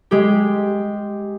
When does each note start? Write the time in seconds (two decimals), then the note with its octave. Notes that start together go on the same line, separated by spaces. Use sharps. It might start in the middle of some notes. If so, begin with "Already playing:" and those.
0.11 G#3 G4